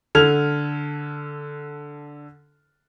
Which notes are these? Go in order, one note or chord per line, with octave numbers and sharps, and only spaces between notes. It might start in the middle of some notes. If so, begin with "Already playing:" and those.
D3 A4 F6 G#6 F7